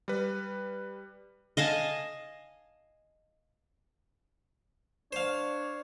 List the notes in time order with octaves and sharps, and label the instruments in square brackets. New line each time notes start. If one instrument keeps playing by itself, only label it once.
[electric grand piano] G3 B4
[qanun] D#5 F5 G#5 A5
[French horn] D4 [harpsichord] C5 F5 [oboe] C#5